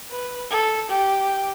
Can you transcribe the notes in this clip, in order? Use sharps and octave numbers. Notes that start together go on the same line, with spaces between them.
B4
A4
G4